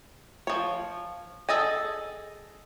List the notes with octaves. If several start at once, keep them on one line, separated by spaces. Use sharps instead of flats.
F3 C#5
G#4 A4 D#5 G#5